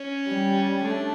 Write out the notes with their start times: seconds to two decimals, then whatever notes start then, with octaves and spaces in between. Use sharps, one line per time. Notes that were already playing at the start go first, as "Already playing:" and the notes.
Already playing: C#4
0.28 G3
0.84 A3 D4